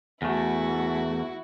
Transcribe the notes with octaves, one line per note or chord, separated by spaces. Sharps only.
E2 A3 E4 F#4